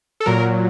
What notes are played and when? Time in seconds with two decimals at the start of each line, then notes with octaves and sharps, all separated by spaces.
0.20 A4
0.26 A#2 F#3 A#4